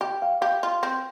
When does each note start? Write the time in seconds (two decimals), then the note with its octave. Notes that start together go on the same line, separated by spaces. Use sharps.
0.01 G4 G5
0.22 F5
0.41 G4 F5
0.63 F4
0.83 C4